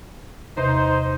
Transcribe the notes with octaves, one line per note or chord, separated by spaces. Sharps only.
E2 C3 D#4 C5